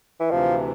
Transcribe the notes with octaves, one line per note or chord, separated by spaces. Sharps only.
E3
D2 C3 E3 F3